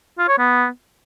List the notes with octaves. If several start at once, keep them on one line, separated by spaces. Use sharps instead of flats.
F4
C#5
B3